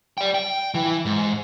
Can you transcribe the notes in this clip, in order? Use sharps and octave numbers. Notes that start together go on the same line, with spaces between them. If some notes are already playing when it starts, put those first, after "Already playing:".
D5 G5
G5
E3
G#2